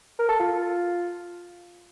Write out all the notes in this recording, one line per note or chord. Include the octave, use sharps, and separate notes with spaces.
A#4
A4
F4